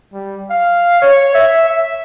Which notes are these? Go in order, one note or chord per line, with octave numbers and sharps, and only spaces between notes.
G3
F5
C#5
E5
E5